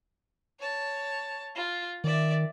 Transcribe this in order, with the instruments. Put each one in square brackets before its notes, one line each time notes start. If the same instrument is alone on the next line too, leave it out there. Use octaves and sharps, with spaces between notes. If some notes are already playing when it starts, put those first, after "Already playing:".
[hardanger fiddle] C#5 A5
F4
[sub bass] D#3 [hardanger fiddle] D5 E5